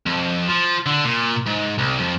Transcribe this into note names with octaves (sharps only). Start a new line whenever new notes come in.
F2
F3
D3
A#2
G#2
C2
F2